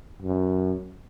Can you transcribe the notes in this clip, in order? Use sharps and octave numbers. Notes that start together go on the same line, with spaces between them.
F#2